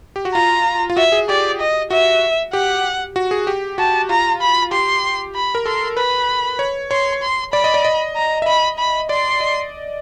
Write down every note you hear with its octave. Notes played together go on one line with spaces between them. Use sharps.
G4
F#4
F4 A#5
F4
F#4 E5
G#4
G4 D5
D#5
F#4 E5
G4 F#5
F#4
G#4
G4
F#4 A5
F4 A#5
B5
G4 C6
B5
A#4
A4 C6
B4 B5
C#5
C#5 C6
C6
D5 B5
D#5
D5
D#5
A#5
E5
D#5 B5
B5
D5 C6
D#5